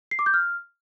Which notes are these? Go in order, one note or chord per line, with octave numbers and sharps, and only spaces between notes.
C7
D6
G6
F6